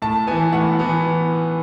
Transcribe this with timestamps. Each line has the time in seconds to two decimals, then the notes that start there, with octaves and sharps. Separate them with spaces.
0.02 A2 A5
0.27 E3 B3 G#5
0.52 A2 F#5
0.79 E3 B3